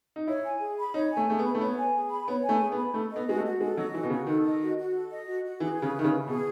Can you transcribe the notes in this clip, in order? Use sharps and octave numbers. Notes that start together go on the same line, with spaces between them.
D#4
E4 C#5
G#5
G#4
B5
D#4 C#5
G#5
A3
A3 G#4
B3
B5
A3
B3 C#5
G#5
G#4
B5
B3 C#5
G#5
A3
G#4
B3
B5
A3 A4
D#5
B3
G#3 F#4
A3
F#4
G#3 A4
F#3 D#5
E3 F#4
B2
C#3 F#4
D#3 A4
D#5
F#4
F#4
A4
D#5
F#4
F#4
E3 G#4
B4
C#3
E4
D#3
C#3
E4
B2 G#4